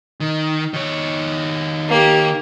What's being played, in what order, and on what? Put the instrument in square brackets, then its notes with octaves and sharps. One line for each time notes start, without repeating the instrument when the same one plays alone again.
[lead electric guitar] D#3
D#3 C#5
[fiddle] A#3 G4